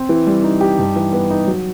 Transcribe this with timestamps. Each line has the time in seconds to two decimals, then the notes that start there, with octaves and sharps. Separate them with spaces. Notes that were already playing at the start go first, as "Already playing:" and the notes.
Already playing: C4
0.09 E3
0.27 G3
0.44 D#4
0.61 G4
0.79 G2
0.96 E3
1.13 B3
1.31 D#4
1.47 F#3